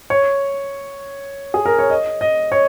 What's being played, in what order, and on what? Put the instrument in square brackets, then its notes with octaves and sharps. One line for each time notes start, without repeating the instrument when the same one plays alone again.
[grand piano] C#5
G#4
A#4
C#5
D#5
D#5
C#5